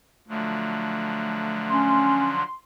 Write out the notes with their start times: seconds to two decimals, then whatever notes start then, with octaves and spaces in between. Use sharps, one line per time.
0.28 D3 F3 F#3 A3
1.70 C#4 C6